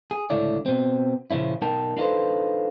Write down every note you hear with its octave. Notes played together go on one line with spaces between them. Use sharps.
G#4
C#2 A2 D3 E4 C#5 D5
B2 C4
A#2 C#3 F3 C#4 E4
B1 D#4 A#4 G5 A5
D4 D#4 F4 A4 B4 C5